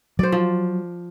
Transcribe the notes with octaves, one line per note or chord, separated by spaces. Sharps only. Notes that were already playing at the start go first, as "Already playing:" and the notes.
F#3 C5 D5
F3